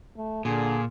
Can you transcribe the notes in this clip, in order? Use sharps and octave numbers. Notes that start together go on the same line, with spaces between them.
A3
A#2 D3 G#4